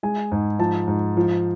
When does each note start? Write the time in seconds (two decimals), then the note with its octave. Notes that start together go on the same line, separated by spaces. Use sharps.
0.03 G#3 G#5
0.32 G#2
0.59 F3 A5
0.88 G#2
1.17 F3